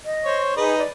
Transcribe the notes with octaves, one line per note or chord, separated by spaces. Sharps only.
D#5
C5 C#5
D#4 G#4 B4 D#5
D5